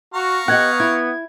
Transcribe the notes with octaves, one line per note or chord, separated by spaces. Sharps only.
F#4 F5 A#5 C#6
B3 G4 D#5 F#5 F#6 G#6
E4 G#6